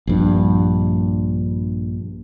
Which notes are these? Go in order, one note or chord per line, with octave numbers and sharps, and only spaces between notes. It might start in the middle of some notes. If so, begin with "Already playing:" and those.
A#1 G2